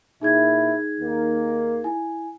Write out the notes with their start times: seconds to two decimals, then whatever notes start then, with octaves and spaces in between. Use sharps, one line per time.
0.21 A#2 D#4 E4 G#4 G#6
1.00 D#2 D#3 A#3
1.84 E4 G#5